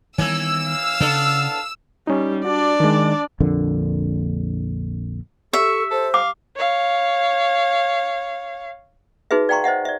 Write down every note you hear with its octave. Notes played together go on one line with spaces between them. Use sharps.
D#3 E3 G3 A#3 B3 C#4 E6
F5
C#3 B3 D4 A4
G3 C#4 D#4
D4 F#4 D5
D#3 G#3
A#1 F2 D3 A#3
G4 A4 E5 C#6
A4 C5
F5 D6
C#5 F5
D#4 F#4 G#4 B4 E5
D5 F5 G5 A#5 C6 C#6
C5 D#5 E5 F#5
D5 E5